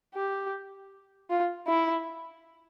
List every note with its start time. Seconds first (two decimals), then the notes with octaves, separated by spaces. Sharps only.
0.14 G4
1.30 F4
1.67 E4